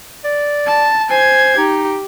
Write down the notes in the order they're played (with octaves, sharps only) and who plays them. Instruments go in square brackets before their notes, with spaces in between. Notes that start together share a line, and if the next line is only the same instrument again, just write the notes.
[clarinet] D5
[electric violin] A5
[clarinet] C5 [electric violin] G#5 G#6
[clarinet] D#4 [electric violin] G4